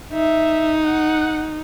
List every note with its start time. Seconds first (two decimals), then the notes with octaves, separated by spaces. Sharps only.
0.13 D#4 E5
0.85 F#5